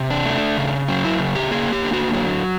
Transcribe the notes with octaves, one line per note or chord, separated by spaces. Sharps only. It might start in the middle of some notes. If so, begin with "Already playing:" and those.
Already playing: C3
D4
A3
C#3
F#3 C#4
E4
C#3
G4
A#3 G#4
G4
D3
F#4
F#3